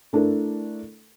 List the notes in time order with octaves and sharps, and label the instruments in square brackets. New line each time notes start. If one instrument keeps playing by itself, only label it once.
[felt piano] A3 D4 E4 A4 A#4